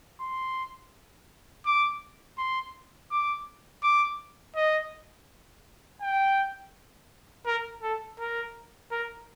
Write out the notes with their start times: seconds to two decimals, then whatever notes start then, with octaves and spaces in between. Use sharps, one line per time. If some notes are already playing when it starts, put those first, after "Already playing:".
0.20 C6
1.66 D6
2.38 C6
3.11 D6
3.83 D6
4.56 D#5
6.02 G5
7.46 A#4
7.83 A4
8.20 A#4
8.92 A#4